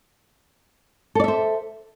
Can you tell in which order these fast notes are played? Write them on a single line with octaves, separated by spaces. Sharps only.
A4 D5 E5 C5